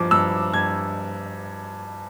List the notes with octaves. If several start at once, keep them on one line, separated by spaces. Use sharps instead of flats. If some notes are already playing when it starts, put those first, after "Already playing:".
Already playing: G2 F3 D6
G2 E6
G2 G#6